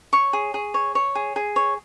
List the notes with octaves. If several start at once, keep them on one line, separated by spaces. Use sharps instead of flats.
C#5 C#6
G#4
G#4
C#5
C#5
G#4
G#4
C#5